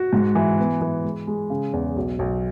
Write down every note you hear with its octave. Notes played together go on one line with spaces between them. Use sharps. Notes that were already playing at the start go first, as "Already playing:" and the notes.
Already playing: F#4
G#2
E3
B3
E3
G#3
G#3
C#3
E2
B1
B1